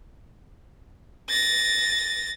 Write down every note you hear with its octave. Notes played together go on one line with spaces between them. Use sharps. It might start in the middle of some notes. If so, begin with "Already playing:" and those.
A6 A#6